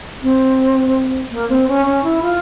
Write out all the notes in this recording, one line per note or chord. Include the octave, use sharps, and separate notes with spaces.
C4
A#3
C4
C#4
C#4
E4
F4